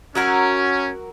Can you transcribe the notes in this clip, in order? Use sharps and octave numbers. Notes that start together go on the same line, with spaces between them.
F#3 C#4 F#4 A#4